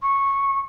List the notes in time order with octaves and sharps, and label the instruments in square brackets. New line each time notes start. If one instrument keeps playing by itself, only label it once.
[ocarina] C#6